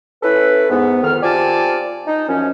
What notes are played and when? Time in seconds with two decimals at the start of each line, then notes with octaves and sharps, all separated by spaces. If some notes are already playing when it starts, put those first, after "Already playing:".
0.23 C#4 E4 A4 B4
0.70 G#2 B3
1.03 F2 D#3 F6
1.23 C4 F4 G4 D5 G#5 A5
2.07 D#4
2.28 F#2 F3 C#4